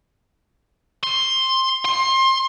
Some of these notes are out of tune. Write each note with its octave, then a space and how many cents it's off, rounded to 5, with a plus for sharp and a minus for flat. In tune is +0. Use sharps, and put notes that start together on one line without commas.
C6 +10
C6 +25